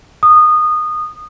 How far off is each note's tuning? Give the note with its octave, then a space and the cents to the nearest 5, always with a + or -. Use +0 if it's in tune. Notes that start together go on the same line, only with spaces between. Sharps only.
D#6 -20